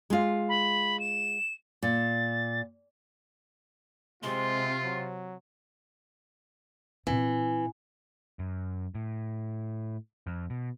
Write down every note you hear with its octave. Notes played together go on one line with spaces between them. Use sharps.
G#3 F4
B5
E7
A#2 A6
C3 G#3 F4 C6
F#3
A#2 E3 C4
F#2
A2
F2
B2